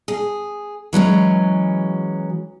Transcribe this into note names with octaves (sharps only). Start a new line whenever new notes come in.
G#4
E3 F#3 G#3 C#4